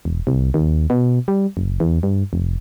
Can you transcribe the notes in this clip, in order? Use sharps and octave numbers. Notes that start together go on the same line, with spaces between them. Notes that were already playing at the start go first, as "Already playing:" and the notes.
E1
C2
D#2
B2
G3
F#1
E2
G2
F1